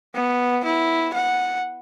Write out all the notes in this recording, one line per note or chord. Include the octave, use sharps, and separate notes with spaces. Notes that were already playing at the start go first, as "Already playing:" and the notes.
B3
E4
F#5